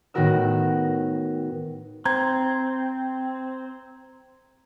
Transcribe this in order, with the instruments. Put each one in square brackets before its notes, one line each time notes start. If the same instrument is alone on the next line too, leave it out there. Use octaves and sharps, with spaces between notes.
[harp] A2 D#3 B3 F#4 A#4 E6
[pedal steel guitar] C4 [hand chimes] A#5 G#6